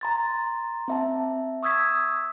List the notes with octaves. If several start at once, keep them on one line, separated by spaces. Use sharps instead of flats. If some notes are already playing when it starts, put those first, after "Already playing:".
A#5 C6 A6
C4 E5 A5
C#6 D#6 E6 G#6 B6